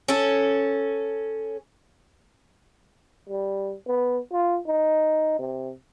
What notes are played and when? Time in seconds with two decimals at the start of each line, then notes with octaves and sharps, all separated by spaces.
0.08 C#4 A4
3.29 G3
3.87 B3
4.32 F4
4.67 D#4
5.39 C3